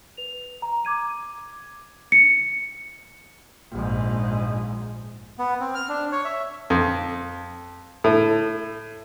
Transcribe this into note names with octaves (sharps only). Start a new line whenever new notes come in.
B4 F7
A#5
D6 G#6 D#7
C#7
A#1 G#2
B3
C4
F6
D4
C#5
E5
F2
A2